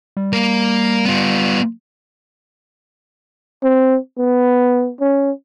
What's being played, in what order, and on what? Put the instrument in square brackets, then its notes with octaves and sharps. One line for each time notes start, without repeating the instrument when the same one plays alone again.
[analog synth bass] G3
[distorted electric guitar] A#3 A#4
B3 F4
[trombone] C4
B3
C#4